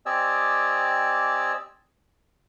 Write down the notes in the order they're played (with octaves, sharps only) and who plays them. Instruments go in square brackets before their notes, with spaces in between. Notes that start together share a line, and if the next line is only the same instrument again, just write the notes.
[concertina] C4 G4 D5 D#5 G#5 E6